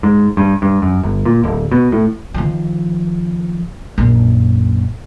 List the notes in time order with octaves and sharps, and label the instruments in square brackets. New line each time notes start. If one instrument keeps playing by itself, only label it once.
[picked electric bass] G#2
G2
G2
F#2
G1
A#2
D1
B2
A2
[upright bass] D#3 F3
A#1 F#2